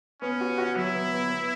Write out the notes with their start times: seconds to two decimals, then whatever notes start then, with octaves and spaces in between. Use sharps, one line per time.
0.22 B3 C#4
0.41 F#4
0.58 F#4
0.76 F#3 E4
0.94 B3
1.13 B3
1.30 B3